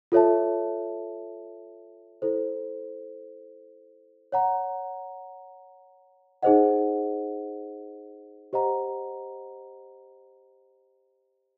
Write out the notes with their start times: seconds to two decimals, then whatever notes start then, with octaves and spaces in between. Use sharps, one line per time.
0.12 F4 A4 C#5 E5 A5
2.22 E4 A4 C5
4.32 C#5 F#5 A#5
6.43 D#4 G#4 C5 D#5 F#5
8.53 G4 C5 D#5 F#5 A#5